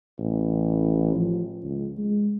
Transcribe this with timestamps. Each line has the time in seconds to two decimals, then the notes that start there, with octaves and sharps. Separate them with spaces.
0.19 A1
1.15 F3
1.64 C#2
1.98 G#3